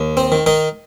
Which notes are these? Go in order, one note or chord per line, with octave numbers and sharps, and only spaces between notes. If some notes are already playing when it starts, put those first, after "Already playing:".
Already playing: D#2
C4
D#3
D#3 D#4